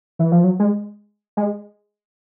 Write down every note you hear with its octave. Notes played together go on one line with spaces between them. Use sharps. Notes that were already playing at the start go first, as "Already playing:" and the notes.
E3
F3
F#3
G#3
G#3